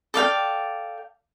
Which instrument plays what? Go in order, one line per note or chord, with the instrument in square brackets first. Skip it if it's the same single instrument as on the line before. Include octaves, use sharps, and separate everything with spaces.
[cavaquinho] A4 D5 F5 G5